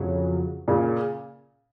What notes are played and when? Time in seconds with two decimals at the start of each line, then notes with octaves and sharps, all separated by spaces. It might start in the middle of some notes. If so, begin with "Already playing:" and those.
Already playing: F2 C#3 F#3
0.68 A#2 C#3